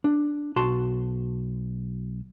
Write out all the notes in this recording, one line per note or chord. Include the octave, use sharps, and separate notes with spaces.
D4
B1 F#4 A5 C6